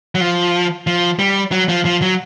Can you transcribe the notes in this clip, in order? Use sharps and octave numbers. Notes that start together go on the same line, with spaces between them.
F#3
F3
F3
G3
F#3
F3
F3
F#3